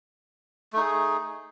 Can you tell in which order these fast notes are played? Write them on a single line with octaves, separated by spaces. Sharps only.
A3 D#4 G#4